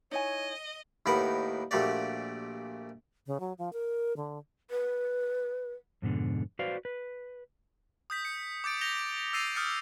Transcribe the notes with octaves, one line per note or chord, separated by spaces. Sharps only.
D#4 E4 C#5 D#5 G#5
D#2 A2 D#4 A#4 B4 F#5
A#1 A#2 A3 F#4 G4 D5
C#3
F#3
F3
A#4
D3
B4
F2 G#2 B2 D3
F#4 B4 C5 D5 F5
B4
D#6 G6 B6
C#7
D6 G6 A6 D7
G6 A#6 F7 G7
E6 A6 A#6 C7 D#7 F7
D#6 F6 G6 A6 C#7